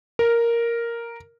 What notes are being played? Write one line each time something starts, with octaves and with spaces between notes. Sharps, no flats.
A#4